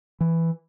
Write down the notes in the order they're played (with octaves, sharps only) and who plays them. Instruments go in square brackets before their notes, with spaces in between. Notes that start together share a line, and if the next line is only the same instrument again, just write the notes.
[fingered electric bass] E3